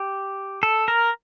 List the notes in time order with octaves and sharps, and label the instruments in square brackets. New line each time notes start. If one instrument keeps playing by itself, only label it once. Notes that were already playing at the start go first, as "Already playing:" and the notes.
Already playing: [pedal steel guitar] G4
A4
A#4